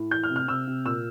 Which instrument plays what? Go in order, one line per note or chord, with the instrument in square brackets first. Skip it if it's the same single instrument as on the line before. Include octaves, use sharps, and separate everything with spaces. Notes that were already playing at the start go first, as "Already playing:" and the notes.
Already playing: [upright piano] A2
E3 G6
F6
C3
F6
C3 E6
C3
A#2 E6